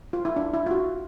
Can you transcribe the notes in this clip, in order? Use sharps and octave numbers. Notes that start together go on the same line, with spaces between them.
F4
E4
D4
E4
F4
F#4